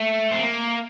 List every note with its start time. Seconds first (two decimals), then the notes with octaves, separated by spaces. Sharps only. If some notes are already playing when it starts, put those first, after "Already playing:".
Already playing: A3
0.31 C4
0.40 A#3